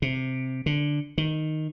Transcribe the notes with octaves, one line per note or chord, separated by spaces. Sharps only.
C3
D3
D#3